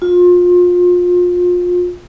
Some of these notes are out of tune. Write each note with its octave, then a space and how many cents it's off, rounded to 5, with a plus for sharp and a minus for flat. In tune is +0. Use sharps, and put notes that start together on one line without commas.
F4 +30